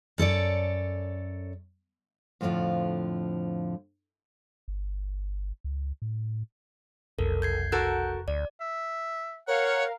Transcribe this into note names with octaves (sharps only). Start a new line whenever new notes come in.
F#2 A4 C#5 D5
F2 A2 D3 D#3 F3
G1
C#2
A2
F1 B1 A4 A#4
G6 G#6 C7
F#4 A4 A#4 F#6 G6
D2 D5
E5
A#4 C#5 F5 F#5